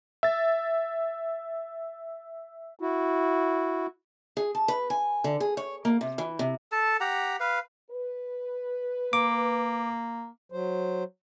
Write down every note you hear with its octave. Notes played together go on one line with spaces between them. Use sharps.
E5 A6
E4 F#4
G#4
A5
B4
G#5
D3
G#4
C#5
A#3
C3
E3
C3
A4 A5
G4 F#5 A#5
B4 F5
B4
A#3 D6
F#3 C5